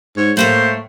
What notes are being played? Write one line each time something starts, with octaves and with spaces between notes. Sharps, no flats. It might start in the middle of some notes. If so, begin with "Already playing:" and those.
G#2 C#5
A2 A3 A#3 C5 C#5